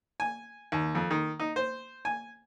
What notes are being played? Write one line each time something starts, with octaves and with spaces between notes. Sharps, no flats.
G#5
D#2
F2
D#3
D#4
C5
G#5